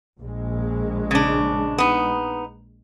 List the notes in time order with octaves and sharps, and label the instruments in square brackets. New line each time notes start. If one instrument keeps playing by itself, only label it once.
[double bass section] A#1 G#3
[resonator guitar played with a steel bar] C#3 D4
B3 D#4